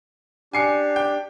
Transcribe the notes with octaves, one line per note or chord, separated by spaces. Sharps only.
D4 G4 G#5 C7 C#7
G5